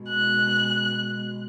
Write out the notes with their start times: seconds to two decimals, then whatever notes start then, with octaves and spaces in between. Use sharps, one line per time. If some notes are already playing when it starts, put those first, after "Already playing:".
Already playing: B2 G#3
0.10 F#6